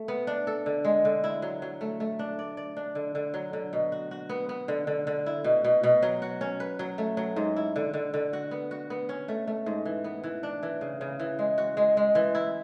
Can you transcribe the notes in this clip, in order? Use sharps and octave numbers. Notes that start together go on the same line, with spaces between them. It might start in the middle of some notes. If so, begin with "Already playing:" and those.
Already playing: A3
B3
D4
A4
D3
G#3
D3
E4
F#3
F#3
A3
A3
D4
D5
D5
D4
D3
D3
F#3
D3
B2
F#4
F#4
B3
B3
D3
D3
D3
E4
B2
B2
B2
F#3
F#4
C#4
B4
F#3
A3
F#3
G#2
E4
D3
D3
D3
F#4
B3
F#4
B3
C#4
A3
A3
G#2
E3
B3
E3
D4
E3
C#3
C#3
E3
G#3
F#4
G#3
G#3
E3
E4